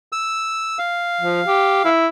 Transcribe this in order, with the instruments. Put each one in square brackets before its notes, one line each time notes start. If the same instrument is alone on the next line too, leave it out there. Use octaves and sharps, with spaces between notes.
[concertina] E6
F5
[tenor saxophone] F3
G4
E4